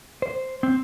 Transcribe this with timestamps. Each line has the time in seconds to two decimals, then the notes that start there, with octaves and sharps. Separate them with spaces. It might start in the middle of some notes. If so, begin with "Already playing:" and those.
0.22 C5
0.63 C4